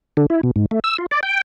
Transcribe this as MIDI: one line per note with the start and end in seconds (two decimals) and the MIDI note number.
0.17 0.26 50
0.30 0.41 64
0.43 0.51 47
0.56 0.66 44
0.71 0.80 57
0.84 0.97 88
0.98 1.06 65
1.11 1.20 74
1.23 1.41 79